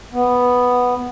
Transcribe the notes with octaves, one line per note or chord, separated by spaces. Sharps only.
B3